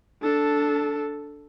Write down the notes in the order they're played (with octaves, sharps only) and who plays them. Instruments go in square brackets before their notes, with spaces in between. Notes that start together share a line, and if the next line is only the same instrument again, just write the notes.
[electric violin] D4 A4